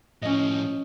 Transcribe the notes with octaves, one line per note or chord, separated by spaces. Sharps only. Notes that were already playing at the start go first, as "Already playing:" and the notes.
A2 F3 C#4 D#5